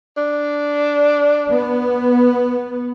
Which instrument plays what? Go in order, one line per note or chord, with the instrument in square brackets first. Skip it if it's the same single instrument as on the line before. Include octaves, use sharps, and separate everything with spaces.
[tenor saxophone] D4
[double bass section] B3